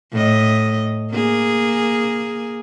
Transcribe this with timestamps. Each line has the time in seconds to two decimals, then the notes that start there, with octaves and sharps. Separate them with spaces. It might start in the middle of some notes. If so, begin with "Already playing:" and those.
0.12 A2 D#5
1.12 A#3 G#4